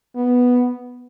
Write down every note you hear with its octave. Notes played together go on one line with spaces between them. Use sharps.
B3